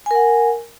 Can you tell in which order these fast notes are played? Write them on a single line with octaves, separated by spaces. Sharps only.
G#5 A#4 F#5